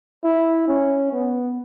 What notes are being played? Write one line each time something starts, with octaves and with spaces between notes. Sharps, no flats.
E4
C#4
B3